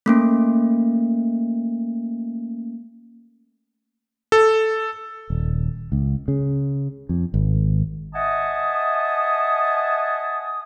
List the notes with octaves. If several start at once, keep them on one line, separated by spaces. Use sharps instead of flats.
A3 A#3 C#4
A4
D#1
C#2
C#3
F2
G#1
D#5 E5 F#5 G#5 A5 D#6